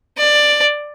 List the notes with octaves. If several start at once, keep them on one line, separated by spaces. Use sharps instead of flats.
D5